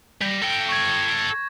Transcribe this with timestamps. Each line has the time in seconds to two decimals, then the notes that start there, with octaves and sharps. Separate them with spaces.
0.22 G3 G6 A#6
0.43 A4 G5
0.69 C#6 G#6